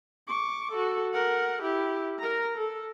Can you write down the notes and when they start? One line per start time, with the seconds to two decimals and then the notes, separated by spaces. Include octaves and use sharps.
0.28 C#6 D6
0.71 F#4 A4
1.14 A#4 F#5
1.62 E4 G4
2.19 A#4 A#5
2.57 A4